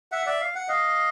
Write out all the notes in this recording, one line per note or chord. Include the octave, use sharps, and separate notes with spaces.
E5 F#5
D5 E5
F5
F#5
D#5 F5